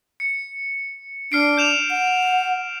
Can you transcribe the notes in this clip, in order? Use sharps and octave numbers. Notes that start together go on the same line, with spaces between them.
C#7
D4 F6 C7 D7
G6 E7 F7
F#5